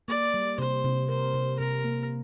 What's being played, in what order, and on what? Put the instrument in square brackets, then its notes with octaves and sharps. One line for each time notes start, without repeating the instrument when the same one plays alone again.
[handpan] A#3 [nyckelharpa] D5
[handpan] G3
[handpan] C3 [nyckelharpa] C5
[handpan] C3
[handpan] A#4 [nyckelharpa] C5
[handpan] C3
[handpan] C3 [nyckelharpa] A#4
[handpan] A#3